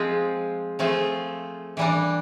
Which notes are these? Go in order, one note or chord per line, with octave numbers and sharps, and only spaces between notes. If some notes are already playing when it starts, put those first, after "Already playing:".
Already playing: F3 G#3 C4 F4 G#4
F3 A3 C4 F4 G#4
E3 G3 A#3 D4